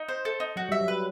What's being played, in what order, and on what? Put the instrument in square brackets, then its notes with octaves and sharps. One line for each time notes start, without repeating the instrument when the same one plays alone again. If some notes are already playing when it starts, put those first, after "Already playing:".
Already playing: [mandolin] D#4
C5
A4
D#4
[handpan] F#3 [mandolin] F#4
[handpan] G3 [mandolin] E5
[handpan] F#3
[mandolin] B4